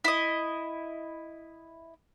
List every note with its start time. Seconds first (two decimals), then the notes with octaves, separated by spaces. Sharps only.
0.04 E4 D#5